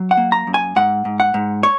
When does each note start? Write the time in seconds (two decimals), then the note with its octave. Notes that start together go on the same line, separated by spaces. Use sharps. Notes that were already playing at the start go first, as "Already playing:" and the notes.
Already playing: F#3
0.11 F#5
0.17 A#3
0.32 A#5
0.47 F#2
0.54 G#5
0.76 G#2 F#5
1.05 G#2
1.20 F#5
1.34 G#2
1.63 C#5